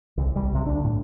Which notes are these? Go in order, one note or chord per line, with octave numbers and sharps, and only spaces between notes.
C2
C2 G3
B1 C3
D2 D4
A2